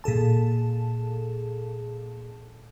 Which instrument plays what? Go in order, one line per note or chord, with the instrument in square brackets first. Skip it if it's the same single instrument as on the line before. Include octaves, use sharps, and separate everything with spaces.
[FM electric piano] A#2 G#4 A4 A5